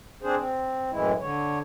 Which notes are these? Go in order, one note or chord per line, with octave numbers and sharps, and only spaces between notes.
C4 D4 G#4 C5
C4
F#2 A2 E3 G#3 E4
D3 C#5